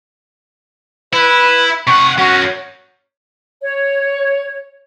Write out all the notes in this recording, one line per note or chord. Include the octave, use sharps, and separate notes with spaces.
E4 B4
C3 F#5 C#6
C#4 F#4 A#4
C#5